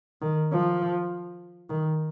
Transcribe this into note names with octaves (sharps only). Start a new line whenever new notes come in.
D#3
F3
D#3